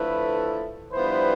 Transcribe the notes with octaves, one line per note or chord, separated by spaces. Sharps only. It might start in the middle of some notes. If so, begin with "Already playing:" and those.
Already playing: D3 F3 A3 E4 A4 B4
G2 F3 B3 E4 B4 C5